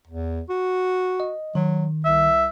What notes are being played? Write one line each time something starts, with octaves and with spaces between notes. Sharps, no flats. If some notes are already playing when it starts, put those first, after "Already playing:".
E2
F#4
D#5
D#3 F#3
C2 E5